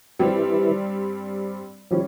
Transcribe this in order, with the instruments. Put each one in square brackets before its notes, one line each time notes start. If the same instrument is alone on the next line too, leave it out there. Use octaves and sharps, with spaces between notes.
[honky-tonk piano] G2 G3 C4 G4 [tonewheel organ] E3
[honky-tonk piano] E3 G3 C#4 [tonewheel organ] F3